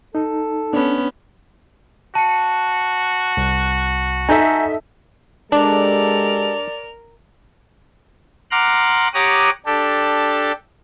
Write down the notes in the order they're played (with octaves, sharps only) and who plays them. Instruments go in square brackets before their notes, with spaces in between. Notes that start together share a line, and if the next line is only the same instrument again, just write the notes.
[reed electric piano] D#4 [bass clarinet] A4
[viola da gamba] B3 C#4 [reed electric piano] D4
[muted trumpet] F#4 [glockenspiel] A5 C#7
[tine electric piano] C2
[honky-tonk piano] D#4 A4 E5 [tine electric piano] G#5 A#5 G6
[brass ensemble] G#3 G4 A4 [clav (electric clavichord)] D4 [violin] A#4 F7 [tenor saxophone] D5
[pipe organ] F#5 A#5 C6 D6 F6 F#6
G4 C#5 F#5 A#5 D6 D#6
D4 G4 A4